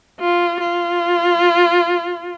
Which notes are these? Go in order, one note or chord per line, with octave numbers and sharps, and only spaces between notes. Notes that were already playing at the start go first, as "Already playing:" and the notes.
F4
F4